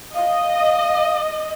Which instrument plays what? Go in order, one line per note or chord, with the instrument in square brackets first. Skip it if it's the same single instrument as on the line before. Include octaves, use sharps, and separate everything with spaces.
[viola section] D#5 [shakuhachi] F5